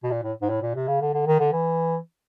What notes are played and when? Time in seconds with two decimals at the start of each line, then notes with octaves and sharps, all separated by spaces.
0.03 B2
0.11 A#2
0.24 A2
0.42 G#2
0.49 A2
0.62 A#2
0.75 C3
0.88 C#3
1.01 D3
1.14 D3
1.27 D#3
1.40 D3
1.52 E3